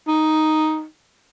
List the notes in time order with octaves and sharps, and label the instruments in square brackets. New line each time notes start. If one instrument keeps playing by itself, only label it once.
[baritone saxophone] D#4